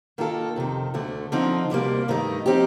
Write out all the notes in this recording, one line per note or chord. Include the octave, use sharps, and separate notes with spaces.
D#3 A#3 F4 A4
F2 C3 D#3
D2 D3 A3
D3 F3 C4 D#4
D2 C3 G3 A#3
G2 D#3 A3 D#4
F3 C4 D#4 G4